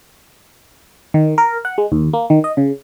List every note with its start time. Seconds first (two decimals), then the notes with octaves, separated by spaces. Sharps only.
1.14 D#3
1.38 A#4
1.65 F#5
1.78 G#3
1.92 D#2
2.13 A#3
2.30 D#3
2.44 D#5
2.57 C#3